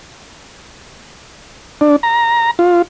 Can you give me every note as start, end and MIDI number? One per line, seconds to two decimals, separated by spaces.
1.81 1.96 62
2.03 2.51 82
2.59 2.82 65